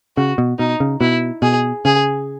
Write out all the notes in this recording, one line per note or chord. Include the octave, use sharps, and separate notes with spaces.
C#3 F#4
B2
B2 D#4
C#3
B2 E4
B2 G#4
C#3 G#4